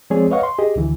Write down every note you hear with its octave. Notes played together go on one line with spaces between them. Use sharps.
F3 G#3 C4 G#4 C#5 D5
B4 C#5 D#5 F5 F#5 C#6
C6
G4 G#4 D#5
D2 D3 E3